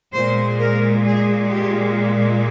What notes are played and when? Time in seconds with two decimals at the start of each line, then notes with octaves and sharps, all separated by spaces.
0.13 A#2 G#3 C5
0.59 A#4
1.05 G#4
1.50 G4